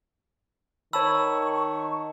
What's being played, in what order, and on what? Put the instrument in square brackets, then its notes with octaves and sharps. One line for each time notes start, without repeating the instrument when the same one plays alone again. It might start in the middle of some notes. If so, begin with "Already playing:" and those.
[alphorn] D#3 [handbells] C#5 A5 B5 [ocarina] C#6 [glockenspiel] E6